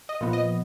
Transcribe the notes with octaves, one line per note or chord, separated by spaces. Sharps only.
D#5
A#2 F3 B3
D#5